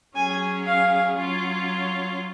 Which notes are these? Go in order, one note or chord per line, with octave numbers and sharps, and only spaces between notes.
F#3 C#4 G#4 G#5
F5
F#3 C#4 F4